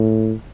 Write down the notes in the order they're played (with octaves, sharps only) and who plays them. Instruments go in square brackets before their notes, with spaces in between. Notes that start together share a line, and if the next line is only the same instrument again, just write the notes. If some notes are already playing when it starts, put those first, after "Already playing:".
Already playing: [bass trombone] A2